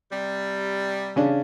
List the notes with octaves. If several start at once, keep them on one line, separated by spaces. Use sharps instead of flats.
C3 G3
C#3 C#4 D4